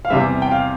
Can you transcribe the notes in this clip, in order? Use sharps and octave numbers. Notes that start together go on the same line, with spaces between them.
F5
E2 C3 G3 E5
G5
F5